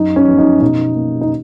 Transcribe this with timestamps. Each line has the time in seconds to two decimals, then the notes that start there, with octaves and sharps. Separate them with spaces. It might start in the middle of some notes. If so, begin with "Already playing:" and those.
Already playing: F#2 D#4
0.16 C#4
0.28 F3 B3
0.38 D#4
0.61 B2 D#4
0.95 A#3
1.21 D#4